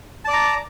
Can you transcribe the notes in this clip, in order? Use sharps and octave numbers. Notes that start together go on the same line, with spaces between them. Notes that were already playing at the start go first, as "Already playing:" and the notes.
D5 A5 A#5 D6